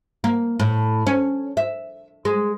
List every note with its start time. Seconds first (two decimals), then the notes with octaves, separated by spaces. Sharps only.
0.24 A#3
0.60 A2
1.07 C#4
1.57 E5
2.25 G#3